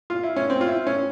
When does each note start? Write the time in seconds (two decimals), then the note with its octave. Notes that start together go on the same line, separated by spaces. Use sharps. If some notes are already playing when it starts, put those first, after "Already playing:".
0.10 F4
0.23 E4
0.36 C#4
0.50 C4
0.61 F4
0.68 E4
0.87 C#4